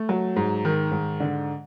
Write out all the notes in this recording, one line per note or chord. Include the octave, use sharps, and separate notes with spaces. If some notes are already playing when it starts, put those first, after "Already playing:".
Already playing: A3
F#3
G#2
D#3
G#2
D3